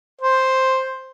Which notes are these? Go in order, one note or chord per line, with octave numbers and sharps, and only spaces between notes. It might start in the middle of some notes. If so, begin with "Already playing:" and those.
C5